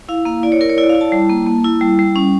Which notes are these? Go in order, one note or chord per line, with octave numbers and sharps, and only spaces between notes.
E4 F5
A#3 F5
E4 D5
C#5
E4 A#4
C#5
E4 D5
F5
E4
A5
G3
A#3
A#3
E4
G3
G3
C#4